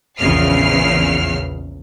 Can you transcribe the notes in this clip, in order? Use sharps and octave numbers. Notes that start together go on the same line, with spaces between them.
A#1 E2 C#3 F6 C7